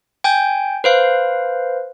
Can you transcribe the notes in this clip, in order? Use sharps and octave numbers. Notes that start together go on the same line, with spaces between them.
G5 G#5 G6
B4 C5 F5